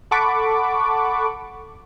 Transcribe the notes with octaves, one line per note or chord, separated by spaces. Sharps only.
A4 F#5 A5 B5 C#6 D6